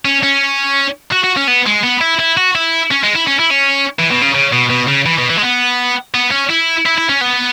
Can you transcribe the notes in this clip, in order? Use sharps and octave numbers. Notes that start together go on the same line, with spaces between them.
C#4
C#4
F#4
F#4
C#4
B3
G#3
B3
E4
E4
F#4
E4
C#4
G#3
E4
C#4
E4
C#4
E3
B2
C#3
C#3
B2
B2
C#3
E3
B2
E3
G#3
B3
B3
C#4
E4
E4
E4
C#4
B3